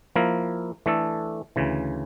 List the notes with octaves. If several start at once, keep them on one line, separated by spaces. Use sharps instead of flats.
F3 A#3 E4 A#4
E3 A3 D4 A4
D2 C#3 E3